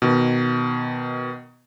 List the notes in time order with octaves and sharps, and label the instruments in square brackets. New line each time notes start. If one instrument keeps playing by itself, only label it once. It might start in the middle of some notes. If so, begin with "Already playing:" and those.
[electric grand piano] B2 D#3